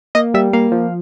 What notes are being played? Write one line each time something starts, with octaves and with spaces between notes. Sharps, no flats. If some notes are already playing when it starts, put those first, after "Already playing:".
A#3 D#5
G3 E5
A#3 F5
F3